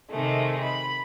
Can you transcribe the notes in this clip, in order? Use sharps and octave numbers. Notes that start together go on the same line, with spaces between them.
C3 D#3 G#3 A3
B5